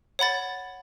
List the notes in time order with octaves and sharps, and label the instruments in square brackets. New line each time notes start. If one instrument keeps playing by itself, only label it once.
[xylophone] C#5 F#5 B5 A6